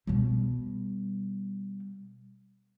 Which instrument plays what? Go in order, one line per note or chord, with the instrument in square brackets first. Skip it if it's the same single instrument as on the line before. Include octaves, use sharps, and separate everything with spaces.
[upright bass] B2 G3